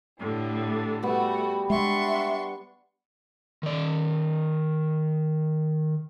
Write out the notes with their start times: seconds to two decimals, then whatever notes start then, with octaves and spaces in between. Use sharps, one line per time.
0.19 A2 D3 G3
1.03 G3 A3 B3 F#4
1.70 G#3 D4 E5 C6 C#6
3.63 D#3 D5